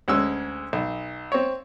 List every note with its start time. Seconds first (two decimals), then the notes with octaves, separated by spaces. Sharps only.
0.08 D2 G#3 C#4 E6
0.73 B1
1.32 C4 C#5